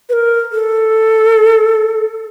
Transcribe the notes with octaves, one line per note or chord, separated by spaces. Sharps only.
B4
A#4
A4